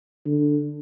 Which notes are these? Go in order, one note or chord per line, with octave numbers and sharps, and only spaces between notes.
D3